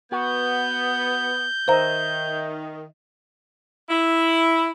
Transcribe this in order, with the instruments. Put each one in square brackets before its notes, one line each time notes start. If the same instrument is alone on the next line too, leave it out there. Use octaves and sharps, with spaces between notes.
[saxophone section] B3 [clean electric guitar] F#4 [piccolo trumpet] G6
[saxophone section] D#3 [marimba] C5 A#5 [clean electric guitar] D#5 E5
[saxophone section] E4